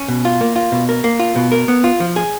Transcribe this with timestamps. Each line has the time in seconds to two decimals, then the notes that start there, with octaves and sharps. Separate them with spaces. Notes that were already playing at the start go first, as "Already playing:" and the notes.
Already playing: C#4
0.08 B2
0.25 F4
0.41 A#3
0.56 F4
0.72 B2
0.89 A#4
1.04 A#3
1.20 F4
1.36 B2
1.52 A#4
1.68 B3
1.84 F4
2.00 F3
2.16 G#4